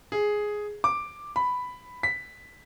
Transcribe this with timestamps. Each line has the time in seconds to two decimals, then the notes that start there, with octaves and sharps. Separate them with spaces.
0.12 G#4
0.84 D6
1.36 B5
2.03 B6